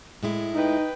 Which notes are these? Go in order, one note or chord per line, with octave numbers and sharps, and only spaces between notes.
A2 G#3 E4
D#4 B4 G5